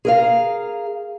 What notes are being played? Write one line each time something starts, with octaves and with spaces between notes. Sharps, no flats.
G#4 A#4 F5